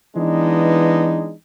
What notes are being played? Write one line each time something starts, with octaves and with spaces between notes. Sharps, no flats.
E3 G#3 B3 D4 D#4